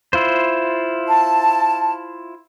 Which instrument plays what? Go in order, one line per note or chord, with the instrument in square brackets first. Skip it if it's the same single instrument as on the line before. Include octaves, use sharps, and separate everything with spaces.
[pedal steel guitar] E4 F4 C5
[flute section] A5